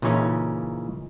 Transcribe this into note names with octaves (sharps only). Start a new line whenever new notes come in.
A#2 C#3 E3 C#4 D#4